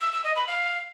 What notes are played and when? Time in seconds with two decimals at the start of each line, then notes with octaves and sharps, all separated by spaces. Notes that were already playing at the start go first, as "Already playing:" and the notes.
0.01 E6
0.12 E6
0.24 D#5
0.36 B5
0.47 F5